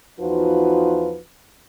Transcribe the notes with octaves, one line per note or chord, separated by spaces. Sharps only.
E2 F3 D#4 F4 F#4 B4